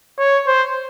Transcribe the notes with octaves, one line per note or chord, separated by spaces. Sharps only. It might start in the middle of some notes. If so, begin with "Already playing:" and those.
C#5
C5